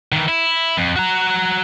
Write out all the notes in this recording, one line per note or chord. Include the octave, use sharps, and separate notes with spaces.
D#3 E3
E4
F2
F#4 A#5